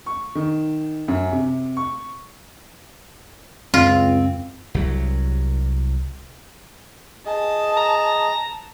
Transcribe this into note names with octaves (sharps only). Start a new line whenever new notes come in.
C#6
D#3
F#2
C3
C#6
C#2 F#2 C4 F4
C2 F#3
G#4 D#5 A5
A#5